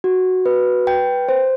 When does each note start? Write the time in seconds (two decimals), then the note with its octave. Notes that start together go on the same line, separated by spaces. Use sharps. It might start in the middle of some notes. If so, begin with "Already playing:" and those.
0.04 F#4
0.46 B4
0.87 G5
1.29 C5